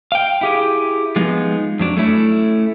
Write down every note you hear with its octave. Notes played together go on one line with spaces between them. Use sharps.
F5 G5
E4 G4 G#4
F3 G#3 B3 D#4
F2 F#3 D4
A3 C#4 E4